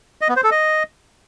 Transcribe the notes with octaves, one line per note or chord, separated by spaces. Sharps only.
D#5
B3
C5
A4
D#5